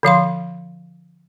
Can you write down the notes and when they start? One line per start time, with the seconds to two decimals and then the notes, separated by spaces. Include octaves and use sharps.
0.03 D3 F3 F5 C6